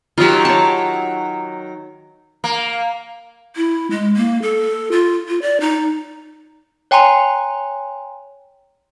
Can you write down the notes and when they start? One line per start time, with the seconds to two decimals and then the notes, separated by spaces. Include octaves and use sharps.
0.18 D#3 F#3 F4 G4
0.45 C#5 A5
2.44 A#3
3.56 E4
3.91 G#3
4.17 A#3
4.42 A4
4.92 F4
5.28 F4
5.42 D5
5.60 D#4
6.91 C#5 G5 G#5 A#5 C6